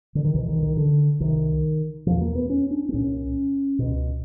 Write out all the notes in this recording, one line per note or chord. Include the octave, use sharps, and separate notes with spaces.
D3
D#3
C2 B2 E3
D#3
D#3
D3
C2 C3 D#3
E2 B2 F3
A#3
B3
C#4
D4
C4
C2 A#2 C#4
C#2 B2